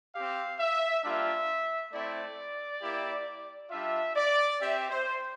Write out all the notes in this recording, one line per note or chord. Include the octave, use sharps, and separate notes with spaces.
C4 G4 F5
E5
G3 A#3 D4 F4 E5
A3 C4 E4 D5
A#3 E4 G4
G3 D4 F4 E5
D5
C4 G4 E5
C5